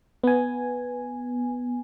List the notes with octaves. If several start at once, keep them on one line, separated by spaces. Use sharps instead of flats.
B3 G#5